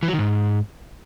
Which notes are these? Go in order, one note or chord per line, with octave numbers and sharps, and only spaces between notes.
E3
F#3
D#3
G#2